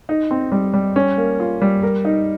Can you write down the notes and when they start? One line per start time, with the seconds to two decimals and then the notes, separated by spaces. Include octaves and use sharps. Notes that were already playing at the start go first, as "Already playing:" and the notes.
0.09 D#4
0.31 C4
0.52 G3
0.74 G3
0.96 C#4
1.17 A#3
1.40 F4
1.62 G3
1.83 A#4
2.05 D#4